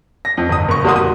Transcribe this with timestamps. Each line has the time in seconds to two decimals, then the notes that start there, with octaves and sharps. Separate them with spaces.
0.25 A#6
0.37 F2
0.49 G1 D#6
0.69 F#1 C#6
0.84 E2 G3 A#3 F#4 C6 D#6
0.96 D#6